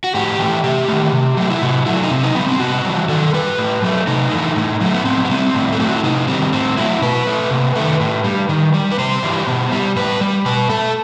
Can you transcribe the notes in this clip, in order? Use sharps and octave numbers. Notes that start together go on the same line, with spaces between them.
F#4
A2 G4
E3 A3
C3 G4
D#3 A3
C3
F#3 A3
E4
C3 F#4
F#3 A3 E4
D#4
C3 C4
D#4
E3 G3 B3
C4
C3 F#4
E3 G3
D#3 A4
G3 B4
A2
F#3 A3
C3 D#4
E3 A3
A2
F#3 A3
B3
A2 C4
B3
G3 C4
A2
A4
F#3 A3 G4
F#4
E4
C3 D#4
D#3 G3 C4
A2 C4
F#3 A3 E4
B2 B4
A3
C3
D#3 A3
A2
G3
D#3
G3
B4
C3 C5
E3 G3
B2
G3
A2 B4
G3
B2 B4
A3 A4